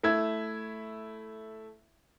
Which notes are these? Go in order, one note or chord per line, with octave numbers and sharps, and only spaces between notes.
A3 E4 E5 G#6